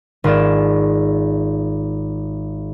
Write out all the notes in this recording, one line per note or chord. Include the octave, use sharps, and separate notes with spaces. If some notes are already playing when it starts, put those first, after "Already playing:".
G#1 F4 G#4 D5 E7